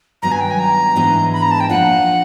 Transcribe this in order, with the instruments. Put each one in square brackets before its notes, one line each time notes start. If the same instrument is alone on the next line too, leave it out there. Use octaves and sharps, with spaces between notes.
[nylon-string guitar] G2 D#3 F#3 B3 [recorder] A#5
[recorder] G#5
G5
G#5
A#5
[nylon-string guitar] G#2 E3 G#3 B3 D4
[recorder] B5
A#5
A5
G5
[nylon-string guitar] A#2 F3 A#3 D4 F4 [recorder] F#5